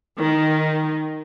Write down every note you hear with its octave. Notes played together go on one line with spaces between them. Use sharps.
D#3